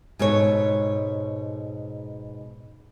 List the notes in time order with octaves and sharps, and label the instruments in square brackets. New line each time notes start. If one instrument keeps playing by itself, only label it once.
[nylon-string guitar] G#2 B2 A4 C#5